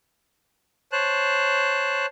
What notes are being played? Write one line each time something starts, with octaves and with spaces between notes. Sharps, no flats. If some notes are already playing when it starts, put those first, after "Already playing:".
C5 C#5 A5 F#6